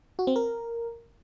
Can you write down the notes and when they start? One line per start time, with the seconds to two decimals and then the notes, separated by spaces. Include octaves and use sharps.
0.19 F#4
0.27 C4
0.36 A#4